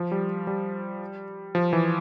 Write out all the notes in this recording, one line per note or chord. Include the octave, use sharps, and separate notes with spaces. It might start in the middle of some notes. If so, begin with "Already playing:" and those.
Already playing: F3
G3
G3
F3
E3